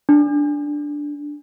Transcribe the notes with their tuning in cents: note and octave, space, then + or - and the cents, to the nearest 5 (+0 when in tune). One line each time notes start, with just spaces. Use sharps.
D4 -5